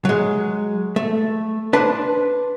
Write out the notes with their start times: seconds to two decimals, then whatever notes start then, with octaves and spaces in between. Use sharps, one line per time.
0.05 F#3 G#3
0.96 A3
1.73 D4 B4 C5 A5